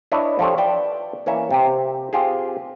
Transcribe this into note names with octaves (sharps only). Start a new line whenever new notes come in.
D4 E4 B4 C#5 D#5
F3 D4 G4 A4 C#5
B4 D5 E5 G5
E3 A#3 C#4 C#5 E5
C3 C4 G4
C4 F4 G4 G#4